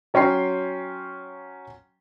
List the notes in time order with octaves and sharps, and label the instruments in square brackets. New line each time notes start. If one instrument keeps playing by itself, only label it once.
[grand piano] F#3 C#4 G5 C6 C7